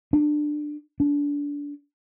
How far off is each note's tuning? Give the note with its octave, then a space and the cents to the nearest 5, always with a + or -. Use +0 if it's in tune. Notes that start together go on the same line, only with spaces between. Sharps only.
D4 +20
D4 -25